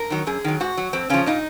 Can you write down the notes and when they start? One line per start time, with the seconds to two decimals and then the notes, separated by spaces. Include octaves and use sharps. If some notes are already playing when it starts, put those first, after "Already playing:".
Already playing: A#4
0.10 D#3 F#3
0.27 F#2 G#4
0.44 D#3 F#3
0.60 G#2 F#4
0.77 F#3
0.93 F2 C4
1.10 C#3 F3 C#4
1.26 A#2 D#4